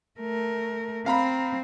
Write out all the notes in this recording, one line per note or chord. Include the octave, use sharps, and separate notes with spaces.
A3 A#4
C4 F5 A#5 B5